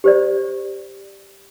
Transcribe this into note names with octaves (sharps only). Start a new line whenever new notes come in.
G4 C5 D5